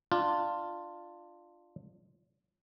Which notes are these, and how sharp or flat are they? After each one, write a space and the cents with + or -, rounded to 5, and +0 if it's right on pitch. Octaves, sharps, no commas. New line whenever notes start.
D4 +20 F4 +0